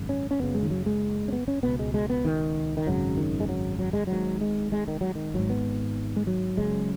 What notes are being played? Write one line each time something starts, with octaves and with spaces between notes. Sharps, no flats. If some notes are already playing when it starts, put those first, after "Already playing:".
Already playing: G#1 F#2 C#3
C#4
C#4
F#1 F#2 C#3 B3
G#3
D#3
F#3
G#3
C#4
B3
C#4
C#2 B2 B3
G#3
G#3
B3
D#3
D#3
G#1 F#2 C#3 F#3
D#3
G#3
F#3
F#3
G#3
G#1 G#2 F#3
G#3
G#3
D#3
F#3
D#3
G#1 G#2 F#3
B3
G#3
F#3
F#1 F#2 C#3 G#3